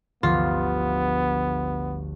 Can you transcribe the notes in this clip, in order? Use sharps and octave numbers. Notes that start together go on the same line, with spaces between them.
G1 D2 F3 B3 F4